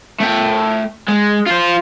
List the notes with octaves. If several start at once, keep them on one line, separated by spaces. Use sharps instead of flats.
A3 G5
G#3
F4 C5